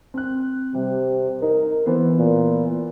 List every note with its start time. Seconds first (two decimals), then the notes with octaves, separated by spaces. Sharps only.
0.14 C4 F#6
0.74 C3 G3
1.42 D#4 A#4
1.86 E3 B3 C5
2.18 A#2